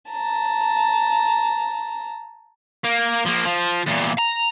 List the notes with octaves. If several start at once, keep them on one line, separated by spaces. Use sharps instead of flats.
A5 A#5
A#3
F3 A#3
F3
E2 A#2
A#5